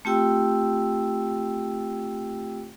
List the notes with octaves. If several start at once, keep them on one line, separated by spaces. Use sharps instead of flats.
A3 C4 F4 G4 G5 E6